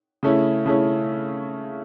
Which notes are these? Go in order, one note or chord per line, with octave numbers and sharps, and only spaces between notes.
C#3 A3 C#4 E4
C#3 A3 C#4 E4